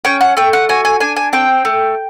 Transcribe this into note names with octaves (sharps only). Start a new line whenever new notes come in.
C#4 G5
F#5
A3 G5
F#5
F#4 G#5
G#5
D4 G#5
G#5
C4 G5
A3